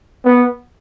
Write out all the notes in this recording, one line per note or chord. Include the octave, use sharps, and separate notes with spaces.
B3